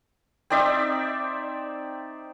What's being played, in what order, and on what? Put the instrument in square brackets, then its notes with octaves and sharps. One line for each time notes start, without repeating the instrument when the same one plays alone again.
[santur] C4 D#4 D5 E5